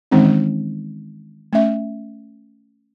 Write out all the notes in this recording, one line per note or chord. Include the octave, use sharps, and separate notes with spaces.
D#3 E3 G#3 C4 C#4 D#4
A3 C#4 E5